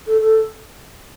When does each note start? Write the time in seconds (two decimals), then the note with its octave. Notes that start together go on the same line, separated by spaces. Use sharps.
0.07 A4
0.21 A4